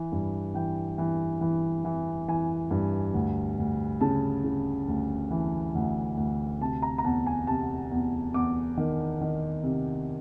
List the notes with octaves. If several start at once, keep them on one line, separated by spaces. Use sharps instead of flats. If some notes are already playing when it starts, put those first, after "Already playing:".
Already playing: E3
G2
E3 G5
E3
E3
E3
E3 G#5
G2
D2
D2
C#3 A5
C#3
D2
E3
D2
D2
C3 A5
A#5
A#5
E2 A5
G#5
C3 A5
E2
E2 D6
D#3
D#3
C3